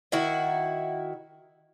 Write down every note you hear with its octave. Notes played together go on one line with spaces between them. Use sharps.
D#3 E4 F#4